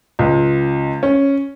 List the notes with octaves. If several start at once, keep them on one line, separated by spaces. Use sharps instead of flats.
C#2
C#4